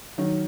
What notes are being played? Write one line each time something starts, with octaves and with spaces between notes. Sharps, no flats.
D#3 F#3